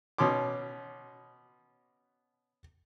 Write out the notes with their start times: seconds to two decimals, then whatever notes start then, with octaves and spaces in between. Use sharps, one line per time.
0.18 B2 C#4 C6 D6